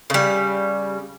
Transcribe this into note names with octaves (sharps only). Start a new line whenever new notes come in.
C#3 G3